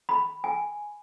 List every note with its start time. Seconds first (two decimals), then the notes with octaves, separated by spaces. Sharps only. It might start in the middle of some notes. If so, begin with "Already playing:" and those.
0.09 B5
0.44 G#5